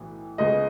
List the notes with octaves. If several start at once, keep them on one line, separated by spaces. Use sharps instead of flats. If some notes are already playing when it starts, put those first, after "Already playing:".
Already playing: B1 A2 E3
C#2 C#3 G#3 B3 D#5